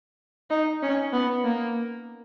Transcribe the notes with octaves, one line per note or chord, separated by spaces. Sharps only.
D#4
C#4
B3
A#3